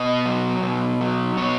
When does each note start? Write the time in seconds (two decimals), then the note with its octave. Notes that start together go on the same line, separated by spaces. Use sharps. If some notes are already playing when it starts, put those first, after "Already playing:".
Already playing: B2 D#5
0.26 F#3
0.63 B2
1.01 F#3
1.37 B2 C#5